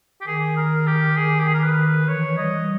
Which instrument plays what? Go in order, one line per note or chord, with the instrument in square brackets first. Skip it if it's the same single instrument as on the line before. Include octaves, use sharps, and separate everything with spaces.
[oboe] G4
[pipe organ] D#3 [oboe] G#4
[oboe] A#4
G4
[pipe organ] D#3 [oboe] G#4
[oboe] G4
G#4
A#4
B4
[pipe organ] E3 [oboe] C#5
[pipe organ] G3 [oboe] D#5